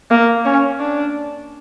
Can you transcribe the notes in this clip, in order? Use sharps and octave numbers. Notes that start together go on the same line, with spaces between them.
A#3
C#4
D4